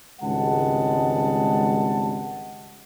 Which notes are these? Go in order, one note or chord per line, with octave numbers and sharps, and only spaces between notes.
G#1 C#2 G3 G#3 F#5 A5